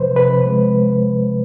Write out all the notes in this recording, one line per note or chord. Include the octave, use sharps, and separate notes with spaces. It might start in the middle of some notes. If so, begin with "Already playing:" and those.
Already playing: C3 F3 B4 C5
C3 B4
G#3